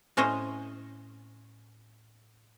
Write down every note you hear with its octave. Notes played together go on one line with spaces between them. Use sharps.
A2 C#4 C5 C#5 D#5